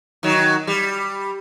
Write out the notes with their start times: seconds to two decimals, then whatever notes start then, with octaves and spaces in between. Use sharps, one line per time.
0.23 D#3 F#3
0.67 G3